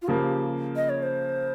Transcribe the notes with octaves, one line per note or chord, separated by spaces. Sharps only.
F4
C#3 F3 A#3 G4
D#5
C#5
C5